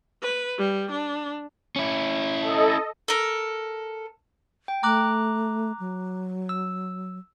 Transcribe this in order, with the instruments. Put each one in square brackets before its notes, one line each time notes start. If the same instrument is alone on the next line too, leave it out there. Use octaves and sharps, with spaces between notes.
[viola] B4
G3
D4
[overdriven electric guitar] C#4 E4
[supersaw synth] A4 D#5
[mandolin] A4 A#4
[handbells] G5
[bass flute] A3 [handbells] A#5 D6 F#6
[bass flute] F#3
[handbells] E6